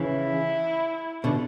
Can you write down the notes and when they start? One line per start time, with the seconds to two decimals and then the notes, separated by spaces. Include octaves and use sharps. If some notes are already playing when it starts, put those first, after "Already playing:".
Already playing: C#3 E3 E4
1.24 B2 D3